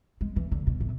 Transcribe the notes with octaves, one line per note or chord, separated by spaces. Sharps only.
G#3
E3
D3
B2
A2